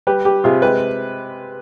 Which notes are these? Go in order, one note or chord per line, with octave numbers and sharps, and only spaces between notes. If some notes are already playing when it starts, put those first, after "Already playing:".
G3 G4 B4
G3 G4
C3 F4 G#4
G#3 G4 B4